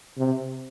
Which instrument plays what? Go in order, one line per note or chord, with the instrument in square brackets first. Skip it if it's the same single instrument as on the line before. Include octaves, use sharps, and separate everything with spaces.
[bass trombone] C3